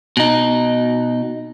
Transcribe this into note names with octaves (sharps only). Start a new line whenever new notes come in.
B2 D#4